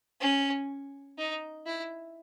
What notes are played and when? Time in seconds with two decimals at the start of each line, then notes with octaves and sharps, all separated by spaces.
0.20 C#4
1.18 D#4
1.66 E4